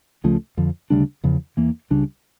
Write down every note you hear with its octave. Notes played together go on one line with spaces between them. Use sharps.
C#2 C#3 F3 A3
F2 D3 F3
D2 C#3 G3 D4
E2 C#3 F3
E2 E3 A#3
C#2 C#3 G3 D4